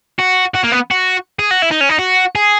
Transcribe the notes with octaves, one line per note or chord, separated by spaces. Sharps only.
F#4
F#4
A#3
B3
F#4
G#4
F#4
E4
D#4
C#4
D#4
F#4
G#4